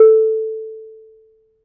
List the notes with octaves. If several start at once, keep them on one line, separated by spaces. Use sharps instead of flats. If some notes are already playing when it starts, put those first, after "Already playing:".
Already playing: A4